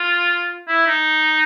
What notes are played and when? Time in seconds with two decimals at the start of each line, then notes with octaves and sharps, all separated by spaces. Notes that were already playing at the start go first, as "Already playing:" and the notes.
Already playing: F4
0.68 E4
0.87 D#4